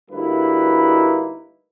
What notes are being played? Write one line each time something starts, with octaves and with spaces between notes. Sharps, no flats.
D2 G3 A#3 D#4 E4 B4